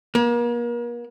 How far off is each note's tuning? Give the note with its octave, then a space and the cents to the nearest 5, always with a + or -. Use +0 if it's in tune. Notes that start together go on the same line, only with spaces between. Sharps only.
A#3 +40